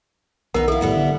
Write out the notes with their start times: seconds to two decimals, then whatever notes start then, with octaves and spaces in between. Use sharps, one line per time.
0.54 B1 B3 D#4 A#4 F#5
0.68 E4 A4 F5
0.81 A2 G3 B3 E4
0.96 D3